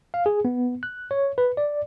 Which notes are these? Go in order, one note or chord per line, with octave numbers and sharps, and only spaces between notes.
F5
G#4
B3
F#6
C#5
B4
D5